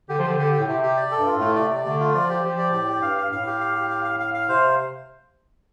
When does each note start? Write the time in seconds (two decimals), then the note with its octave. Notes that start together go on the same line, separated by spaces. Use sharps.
0.09 D3 G4
0.18 F3
0.23 D3 G4
0.38 D3 G4
0.53 G4
0.59 A2
0.68 C3 G4
0.83 G4
0.97 D5
1.11 A4
1.17 G2
1.26 F4
1.36 A2 A3
1.55 C3 D5
1.71 D5
1.85 D3 A3
2.00 F4
2.14 F3 D5
2.30 G4
2.44 F3 G4
2.59 D5
2.73 A2 G4
2.87 G4
3.02 G2 F5
3.17 F5
3.32 A2 F5
3.47 G4
3.60 F5
3.75 G4
3.90 F5
4.04 F5
4.20 F5
4.34 F5
4.49 C3 C5